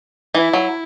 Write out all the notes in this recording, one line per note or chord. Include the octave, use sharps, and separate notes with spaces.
E3 E4
F#3